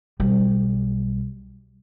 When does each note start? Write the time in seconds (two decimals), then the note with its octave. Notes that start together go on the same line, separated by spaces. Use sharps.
0.20 B1 G3